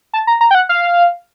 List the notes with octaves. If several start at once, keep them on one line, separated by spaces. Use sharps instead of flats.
A5
A#5
A#5
G5
F#5
F5